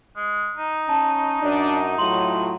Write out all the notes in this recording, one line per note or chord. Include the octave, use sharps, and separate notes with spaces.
G#3
D#4
C#4 A5
F#2 D4
A2 F#3 F4 C6 F#7